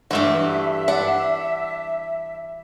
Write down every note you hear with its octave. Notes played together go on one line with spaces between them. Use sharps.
G2 E3 A3 F#4 E5
D4 F#5